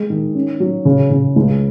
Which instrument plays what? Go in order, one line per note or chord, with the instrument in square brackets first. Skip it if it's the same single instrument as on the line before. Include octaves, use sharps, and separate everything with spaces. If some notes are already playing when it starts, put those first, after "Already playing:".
Already playing: [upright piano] G#3
D#3
C#4
F#3
C#3
C#3
C#2